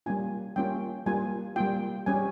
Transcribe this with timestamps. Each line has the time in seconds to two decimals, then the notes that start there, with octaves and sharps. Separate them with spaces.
0.06 G3 A#3 C#4 F4 G#5
0.56 G3 A#3 C#4 F4 G5
1.06 G3 A#3 F4 G#5
1.56 G3 A#3 F4 G5
2.06 G3 C#4 G4 G#5